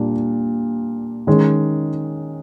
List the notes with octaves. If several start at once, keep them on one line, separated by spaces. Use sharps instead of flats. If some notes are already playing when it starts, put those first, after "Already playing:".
Already playing: A#2 G3 A#3 D4
D#3 G#3 C#4